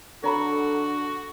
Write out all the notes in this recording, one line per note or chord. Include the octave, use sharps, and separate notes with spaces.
D3 F#4 A4 C#5 A#5 B5